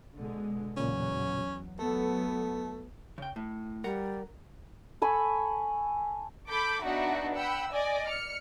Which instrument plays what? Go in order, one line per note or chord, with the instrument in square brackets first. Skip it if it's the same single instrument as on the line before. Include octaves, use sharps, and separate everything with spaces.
[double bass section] B2 D3 G#3
[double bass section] E2 F#3 [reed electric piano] A#2 C#3 [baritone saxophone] C#4
[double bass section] F#3 B3 [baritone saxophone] A3 [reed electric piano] A4
[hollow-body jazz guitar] C#3 G5
A2
[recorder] G3 [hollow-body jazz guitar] A#4 F#5 A#5
[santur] A4 G#5 B5 C#6
[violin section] A4 B5 D6 G6
B3 D4 D#4 F#4 E5 F#5
F#5 G5 B5 E6
D5 D#5 G#5
F6 C#7